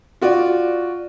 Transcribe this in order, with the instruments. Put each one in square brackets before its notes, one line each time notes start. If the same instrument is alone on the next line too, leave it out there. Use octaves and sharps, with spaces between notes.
[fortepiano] F4 F#4 D5